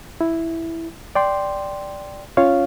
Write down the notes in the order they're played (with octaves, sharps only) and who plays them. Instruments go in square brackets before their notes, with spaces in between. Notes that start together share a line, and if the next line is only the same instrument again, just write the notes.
[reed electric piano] E4
D5 G5 C6
C#4 F4 C#5 F5